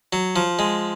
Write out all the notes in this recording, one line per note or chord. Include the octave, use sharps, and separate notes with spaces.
F#3
F3
G#3